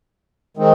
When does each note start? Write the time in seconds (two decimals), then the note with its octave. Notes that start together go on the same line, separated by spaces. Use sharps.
0.57 D#3 G#3 C4 D#4